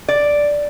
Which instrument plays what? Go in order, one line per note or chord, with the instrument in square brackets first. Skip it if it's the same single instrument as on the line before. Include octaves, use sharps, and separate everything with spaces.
[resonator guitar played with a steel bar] D5